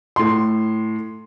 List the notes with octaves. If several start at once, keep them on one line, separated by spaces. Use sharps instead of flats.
A2 C6